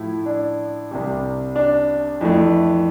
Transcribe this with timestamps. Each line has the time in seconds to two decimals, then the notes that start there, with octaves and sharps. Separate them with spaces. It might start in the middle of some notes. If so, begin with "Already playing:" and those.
Already playing: A2 F3 A3 E4
0.26 D4
0.91 C2 C3 G3
1.56 D4
2.21 F2 E3 A3